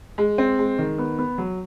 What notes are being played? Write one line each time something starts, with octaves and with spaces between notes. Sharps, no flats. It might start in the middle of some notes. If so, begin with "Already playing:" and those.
G#3
C4
G#3
D#3
B3
B3
F#3